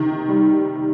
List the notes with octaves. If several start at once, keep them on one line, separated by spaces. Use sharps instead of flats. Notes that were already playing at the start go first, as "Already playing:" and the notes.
Already playing: C3 D#3
G3